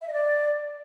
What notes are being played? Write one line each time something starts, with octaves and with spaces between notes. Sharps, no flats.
E5
D#5
D5